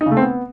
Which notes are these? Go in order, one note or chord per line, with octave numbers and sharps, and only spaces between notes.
D#4
C#3
A3
C4
B3